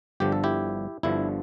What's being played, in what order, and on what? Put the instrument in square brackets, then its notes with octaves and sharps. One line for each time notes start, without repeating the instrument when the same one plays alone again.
[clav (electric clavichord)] G1 G2 D3 F3 G4
A4
E4 G4
G1 G2 D3 F3 E4